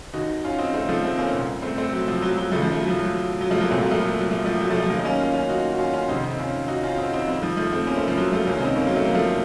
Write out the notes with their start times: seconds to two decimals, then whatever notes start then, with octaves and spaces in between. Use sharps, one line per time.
0.14 D#2 D#3 D#4 F#4
0.44 C#4 F4
0.59 C4 D#4
0.74 A3 C4
0.89 F3 A3
1.03 A3 C4
1.18 A#3 C#4
1.33 C2 A#2
1.62 A3 C4
1.78 A3 C4
1.93 F#3
2.08 F3
2.22 F#3
2.37 F#3
2.52 D#2 C#3 F3 A3
2.62 F3
2.71 A3
2.81 F#3
2.90 F3
3.00 F#3
3.41 F#3
3.51 F3 A3
3.61 F#3 A#3
3.70 C2 A#2 A3 C4
3.81 F#3 A#3
3.91 F3 A3
4.00 F#3
4.16 F#3
4.31 F3 A3
4.45 F3 A3
4.60 F#3
4.70 F3 A3
4.80 F3 A3
4.90 D#2 F#3 A#3
4.93 D#3
4.99 D#4
5.04 A#3 C#4
5.20 C#4 F4
5.34 C#4 F4
5.49 D#4 F#4
5.73 F#4
5.79 C#4 F4
5.93 C#4 F4
6.09 F2 C3 D#3 C4 D#4
6.24 C4 D#4
6.39 C#4 F4
6.68 D#4 F#4
6.84 C#4 F4
6.98 C4 D#4
7.13 C4 D#4
7.28 F2 D#3 C4 D#4
7.43 F3
7.57 F3 A3
7.72 A3 C4
7.87 A#3 C#4
7.97 A3 C4
8.08 F3
8.17 F#3
8.32 F3 A3
8.47 C#2 C3 D#3 A#3 C#4
8.57 C#4
8.61 C4 D#4
8.76 A#3 C#4
8.87 F#3 A#3
8.96 A3
9.05 A#3
9.13 F3 A3